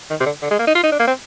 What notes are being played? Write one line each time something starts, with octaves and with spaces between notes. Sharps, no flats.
D#3
C3
D3
D3
G#3
A#3
D#4
F4
D#4
D4
A#3
C4